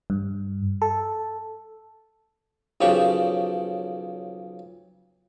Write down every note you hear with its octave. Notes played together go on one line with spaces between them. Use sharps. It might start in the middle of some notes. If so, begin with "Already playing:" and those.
G2
A4
B1 C#3 F3 G4 C#6